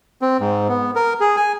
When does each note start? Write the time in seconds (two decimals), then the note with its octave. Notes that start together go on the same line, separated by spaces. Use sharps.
0.22 C4
0.40 G#2
0.69 B3
0.95 A#4
1.20 G#4
1.36 G#5